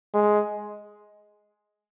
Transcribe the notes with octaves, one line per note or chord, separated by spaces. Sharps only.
G#3